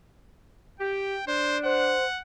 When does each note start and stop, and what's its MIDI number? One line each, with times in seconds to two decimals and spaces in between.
0.80 1.16 67
0.80 1.25 79
1.27 1.94 62
1.27 1.58 72
1.65 2.06 72
1.65 2.21 78